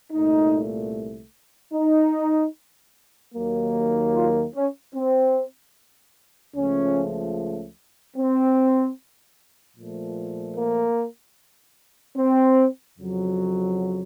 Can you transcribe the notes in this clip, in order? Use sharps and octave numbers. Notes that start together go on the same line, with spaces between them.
C2 A#2 A3 D#4
D#4
D#2 D#3 F#3 A#3
F4
C#4
C4
C#2 C#3 F3 A3 C#4
C4
A#2 F3 A3
A#3
C4
F2 C#3 F#3